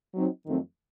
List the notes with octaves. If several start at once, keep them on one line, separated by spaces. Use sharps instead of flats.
F#3 C4 D#4
F2 D#3 F#3 A3 C4